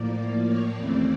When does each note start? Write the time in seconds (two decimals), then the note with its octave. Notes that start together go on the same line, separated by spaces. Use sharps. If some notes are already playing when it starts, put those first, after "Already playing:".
Already playing: A2 F3 A#3 D5
0.46 C#5
0.75 D#2 C#3 E3 A3 C4 D5